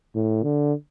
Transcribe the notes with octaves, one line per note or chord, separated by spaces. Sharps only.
A2
D3